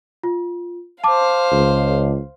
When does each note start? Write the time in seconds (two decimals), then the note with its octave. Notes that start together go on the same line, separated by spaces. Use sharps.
0.23 F4
1.04 C5 F5 A5 D6
1.52 C#2